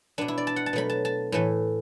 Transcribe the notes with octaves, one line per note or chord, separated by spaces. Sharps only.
B2 B3 D4
E4
D5
A5
F#5
A5
B2 F#3 A3 B5
A5
A5
A2 E3 A3